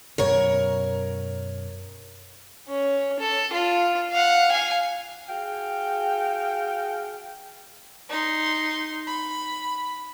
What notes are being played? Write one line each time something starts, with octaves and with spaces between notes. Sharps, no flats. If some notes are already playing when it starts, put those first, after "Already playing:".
F#2 B2 A#4 C#5
C#4
A4
F4
F5 F#5
F5 G#5
F#4 G#4 F5 G5
D#4 C6
B5